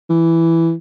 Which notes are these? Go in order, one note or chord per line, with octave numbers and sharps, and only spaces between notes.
E3